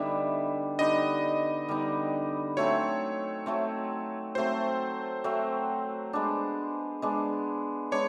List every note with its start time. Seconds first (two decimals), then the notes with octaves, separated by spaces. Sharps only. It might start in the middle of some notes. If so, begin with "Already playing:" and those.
Already playing: D3 G3 B3 D#4 E5
0.79 D3 G3 B3 D#4 D#5
1.69 D3 G3 B3 D#4
2.57 F#3 A3 C4 C#5
3.46 F#3 A3 C4
4.35 F#3 A3 C4 C5
5.24 F#3 A3 C4
6.13 G#3 B3 D4
7.02 G#3 B3 D4
7.92 G#3 B3 D4 C#5